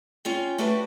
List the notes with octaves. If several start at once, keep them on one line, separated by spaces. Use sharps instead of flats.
C#4 F4 G5
A3 D4 F#4 G4 B4